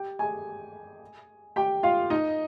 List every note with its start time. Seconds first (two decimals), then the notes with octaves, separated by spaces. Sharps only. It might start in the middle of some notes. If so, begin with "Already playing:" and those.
Already playing: G4 G5
0.19 G#4 G#5
1.56 G4 G5
1.83 F4 F5
2.10 D#4 D#5